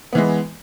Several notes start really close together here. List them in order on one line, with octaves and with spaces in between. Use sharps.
B3 E3 G#3